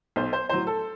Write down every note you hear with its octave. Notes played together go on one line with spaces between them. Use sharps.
B1 C5
C5
A2 F#3 C5
A4